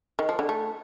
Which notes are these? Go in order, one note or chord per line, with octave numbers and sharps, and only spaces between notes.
D#3
F3
D3
A3